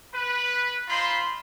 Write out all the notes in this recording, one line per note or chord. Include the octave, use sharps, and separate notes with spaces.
B4
D#4 F4 C5 B5 C6